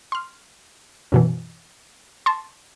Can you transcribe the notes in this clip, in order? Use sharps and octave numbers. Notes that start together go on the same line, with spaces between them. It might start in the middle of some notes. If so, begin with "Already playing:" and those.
C6 F6
F#2 B2 E3
A5 C6